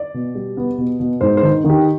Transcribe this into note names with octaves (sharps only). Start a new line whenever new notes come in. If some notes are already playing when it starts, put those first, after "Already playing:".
Already playing: D5
B2
G3
B3
B2
B2
G#2 C5
C5
D#3
D#3
G4